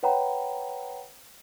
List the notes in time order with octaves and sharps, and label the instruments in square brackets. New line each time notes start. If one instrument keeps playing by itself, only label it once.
[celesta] B4 C#5 F#5 G5 A#5 B5